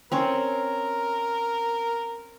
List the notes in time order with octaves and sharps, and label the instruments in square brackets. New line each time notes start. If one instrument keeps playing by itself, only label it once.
[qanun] C4 C#4 C#5 [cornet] A#4